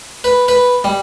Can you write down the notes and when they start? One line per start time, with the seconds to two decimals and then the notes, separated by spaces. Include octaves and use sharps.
0.24 B4
0.48 B4
0.84 G3